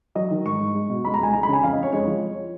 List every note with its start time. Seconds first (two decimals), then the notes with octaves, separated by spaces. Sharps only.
0.15 F#3 D#5
0.30 D#3
0.45 G#2 C#6
0.60 G#2
0.75 G#3
0.89 B2
1.04 C#2 B5
1.14 A#5
1.19 C#2 G#5
1.33 G#3 A#5
1.43 B5
1.48 C#3 G#5
1.63 F2 F5
1.73 D#5
1.78 F2 C#5
1.92 G#3 C#5
2.06 F3